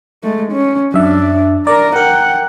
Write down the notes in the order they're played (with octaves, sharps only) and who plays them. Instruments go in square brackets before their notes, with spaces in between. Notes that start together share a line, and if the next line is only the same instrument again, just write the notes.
[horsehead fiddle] G#3 A3
C#4
[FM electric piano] F#2 E5 [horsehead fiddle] D4
[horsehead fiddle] A#4 A#5 [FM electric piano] D5
[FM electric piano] A#4 [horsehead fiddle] F#5 G5